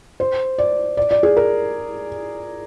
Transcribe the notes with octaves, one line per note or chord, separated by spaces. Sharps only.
C5
D5
D5
D5
G#4
A#4